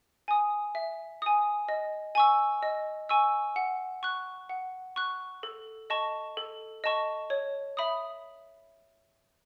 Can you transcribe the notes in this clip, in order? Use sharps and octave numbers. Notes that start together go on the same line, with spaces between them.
G#5 D#6
E5
G#5 D#6
D#5
G#5 C#6 E6
D#5
G#5 C#6 E6
F#5
C#6 F#6
F#5
C#6 F#6
A4
D#5 A5 C#6
A4
D#5 A5 C#6
C#5
E5 B5 D#6